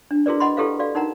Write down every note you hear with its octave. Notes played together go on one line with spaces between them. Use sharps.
D4
E4 F#4 G#4 A#4 B4 D5
D#5 F#5 B5 C6
E4 G4 A4 B4 F5
F#4 D5 F5
D#4 A#4 F#5 A#5